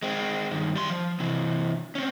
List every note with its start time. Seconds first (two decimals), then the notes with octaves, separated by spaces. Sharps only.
0.03 G#3 C4
0.51 G2 D#3
0.76 G3 C6
0.90 F3
1.20 C3 E3
1.95 C4 C#4